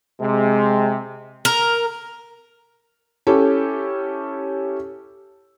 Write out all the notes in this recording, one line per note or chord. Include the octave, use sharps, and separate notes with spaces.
C3 G#3
A#4
C#4 E4 G4 A4